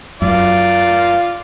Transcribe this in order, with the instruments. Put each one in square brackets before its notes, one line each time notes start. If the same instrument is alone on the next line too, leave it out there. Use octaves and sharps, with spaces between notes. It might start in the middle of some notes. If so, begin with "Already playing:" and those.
[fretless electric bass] F#2 [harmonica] F4 D5